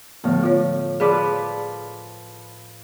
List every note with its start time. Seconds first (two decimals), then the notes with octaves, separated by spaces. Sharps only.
0.24 A2 D3 F3 B3 F5
0.43 F4 C#5
1.00 F3 G#4 B4 D5 D6 F#6